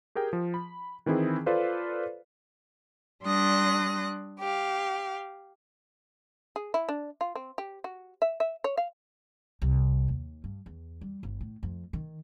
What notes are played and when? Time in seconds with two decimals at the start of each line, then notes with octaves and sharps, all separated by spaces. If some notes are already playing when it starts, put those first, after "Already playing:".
0.15 G4 G#4 A#4 G5
0.33 F3
0.54 B5
1.06 D#3 E3 C4 E4 G#4
1.46 F4 A4 B4 C5 D5 F5
3.24 G3 D4 C6 D#6 F#6 A#6
4.39 G4 F5
6.56 G#4
6.74 E4
6.89 D4
7.21 F4
7.35 C4
7.58 G4
7.84 F#4
8.22 E5
8.40 E5
8.64 C#5
8.77 F5
9.62 C2
10.08 D#2
10.44 G2
10.66 E2
11.01 G3
11.23 G1
11.41 A2
11.63 F2
11.93 D#3